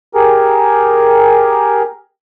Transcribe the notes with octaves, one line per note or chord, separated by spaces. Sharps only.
G4 G#4 A#4